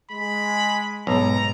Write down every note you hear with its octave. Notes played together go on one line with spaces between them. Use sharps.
G#3 B5
B1 G#2 A#5